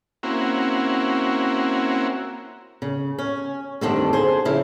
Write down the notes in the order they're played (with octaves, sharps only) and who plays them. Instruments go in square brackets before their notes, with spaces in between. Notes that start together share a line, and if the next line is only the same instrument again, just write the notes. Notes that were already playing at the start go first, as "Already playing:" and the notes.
[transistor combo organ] A#3 C4 C#4 E4 F#4
[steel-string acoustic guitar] C#3
C#4
D2 G2 D3 D#3 C4 D4
G#4 C5
C#3 F3 E4